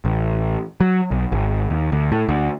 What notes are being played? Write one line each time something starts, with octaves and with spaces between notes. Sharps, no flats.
A1
F#3
B1
G#1
D#2
D2
A2
D2